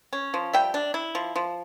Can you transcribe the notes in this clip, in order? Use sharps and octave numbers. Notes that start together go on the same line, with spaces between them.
C#4
F3
G3 E5 G5
D4
E4
F3
F3